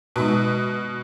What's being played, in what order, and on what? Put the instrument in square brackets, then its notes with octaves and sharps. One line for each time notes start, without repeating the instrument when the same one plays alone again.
[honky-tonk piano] B2 [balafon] G#3 D#4 F#4